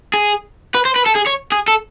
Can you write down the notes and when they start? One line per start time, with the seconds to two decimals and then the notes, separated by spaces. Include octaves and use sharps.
0.14 G#4
0.75 B4
0.85 C5
0.96 B4
1.06 A4
1.16 G#4
1.27 C#5
1.52 G#4
1.68 A4